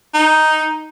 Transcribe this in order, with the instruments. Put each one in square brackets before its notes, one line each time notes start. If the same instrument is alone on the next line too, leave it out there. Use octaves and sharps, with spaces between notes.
[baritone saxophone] D#4